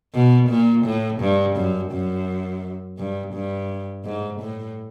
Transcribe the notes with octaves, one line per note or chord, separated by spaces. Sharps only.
B2
A#2
A2
G2
F#2
F#2
G2
G2
G#2
A2